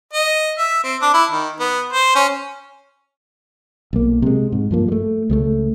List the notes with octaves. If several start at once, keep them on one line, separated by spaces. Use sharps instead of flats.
D#5
E5
C4
D4
E4
D#3
B3
C5
C#4
B1 A#3
C3 G#3
G#2
G2 F3 A#3
G3 A3
C#2 G#3 A3